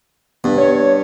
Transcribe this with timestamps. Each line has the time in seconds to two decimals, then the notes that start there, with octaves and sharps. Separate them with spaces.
0.44 G2 B3
0.58 C#5